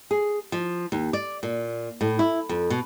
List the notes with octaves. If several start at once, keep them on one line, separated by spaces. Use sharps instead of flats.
G#4
F3
D#2
D5
A#2
A2
E4
F2
B2